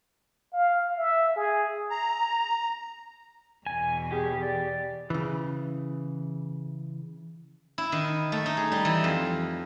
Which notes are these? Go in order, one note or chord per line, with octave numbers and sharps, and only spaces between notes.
F5
E5
G#4
A#5
E2 B2 G#5
G4 G#4
D5
C#3 E3
E4
D#3
A3
D#4
G#4
G3
E3
F2